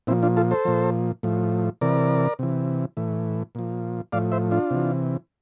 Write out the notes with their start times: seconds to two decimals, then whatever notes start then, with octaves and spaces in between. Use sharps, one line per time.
0.07 A#2 F3 C4 E4
0.23 D4 F4
0.37 F4 A4
0.51 A4 C5
0.65 A#2 F3
1.23 A2 F3
1.81 C3 E3 A#4 D5
2.39 C3 E3
2.97 A2 E3
3.55 A#2 F3
4.12 A2 F3 D5 F5
4.32 C5 E5
4.51 D4 F4
4.70 C3 E3